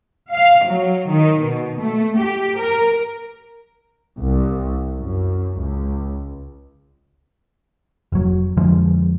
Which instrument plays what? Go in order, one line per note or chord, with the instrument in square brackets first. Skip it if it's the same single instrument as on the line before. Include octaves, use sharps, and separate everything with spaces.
[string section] F5
F#3
D#3
B2
A3
G4
A#4
[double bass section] C2
F#2
C#2
[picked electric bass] F1 F#3
F2 D3 F3 G#3